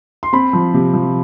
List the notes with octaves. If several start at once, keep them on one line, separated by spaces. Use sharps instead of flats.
C6
C4 B5
F3
C3
F3